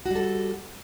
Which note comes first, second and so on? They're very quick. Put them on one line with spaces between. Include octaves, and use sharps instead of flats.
F#4 G3 A4